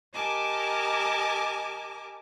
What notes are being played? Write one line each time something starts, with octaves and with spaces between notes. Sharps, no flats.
G4 A#4 D#5 G#5 A5 D6